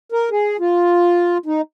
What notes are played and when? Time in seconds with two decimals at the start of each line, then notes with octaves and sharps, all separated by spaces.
0.12 A#4
0.31 G#4
0.60 F4
1.46 D#4